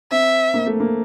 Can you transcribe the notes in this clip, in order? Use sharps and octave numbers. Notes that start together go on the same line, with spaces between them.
C4 E5
A#3
A3
A#3